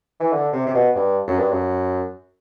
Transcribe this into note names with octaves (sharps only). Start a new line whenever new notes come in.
E3
D3
C3
C3
B2
G2
F#2
G2
F#2